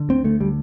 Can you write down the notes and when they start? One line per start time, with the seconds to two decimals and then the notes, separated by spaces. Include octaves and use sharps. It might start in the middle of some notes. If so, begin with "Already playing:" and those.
Already playing: D3
0.09 D2 C4
0.24 D2 A3
0.40 D3 G3